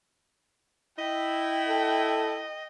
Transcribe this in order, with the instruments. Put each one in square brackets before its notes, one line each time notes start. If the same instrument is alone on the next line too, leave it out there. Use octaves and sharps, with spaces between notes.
[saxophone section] E4 [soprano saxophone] D#5 [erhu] G5
[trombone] A4